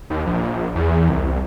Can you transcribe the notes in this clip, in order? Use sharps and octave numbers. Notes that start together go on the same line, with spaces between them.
D#2
A#1
E2
C2